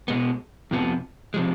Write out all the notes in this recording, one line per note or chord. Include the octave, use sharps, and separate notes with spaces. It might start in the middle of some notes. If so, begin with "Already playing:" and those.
B2 G#3 B3
F2 C3 F3 B3
C3 F3 G#3